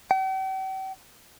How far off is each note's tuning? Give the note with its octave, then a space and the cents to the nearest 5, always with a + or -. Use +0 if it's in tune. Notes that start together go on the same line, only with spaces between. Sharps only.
G5 -45